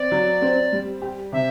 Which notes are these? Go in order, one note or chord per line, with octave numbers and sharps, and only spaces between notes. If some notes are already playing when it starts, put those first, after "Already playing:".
Already playing: C4 D5
F#3
C4
G3
G4
C3 E5